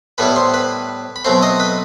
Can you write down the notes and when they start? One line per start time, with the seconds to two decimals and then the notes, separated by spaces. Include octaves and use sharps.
0.18 A2 G3 B3 E4 B4 B5
0.36 C5 C6
0.54 B4 B5
1.16 B5
1.25 B2 F#3 A3 C4 C5 C6
1.42 D#5 D#6
1.60 B4 B5